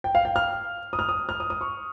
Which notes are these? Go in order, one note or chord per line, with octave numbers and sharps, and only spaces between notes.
G5
F5
G5
F6
D#6
F6
D#6
F6
D#6
D#6
C#6